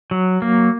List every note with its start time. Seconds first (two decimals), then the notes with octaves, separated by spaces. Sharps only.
0.11 F#3
0.42 A#3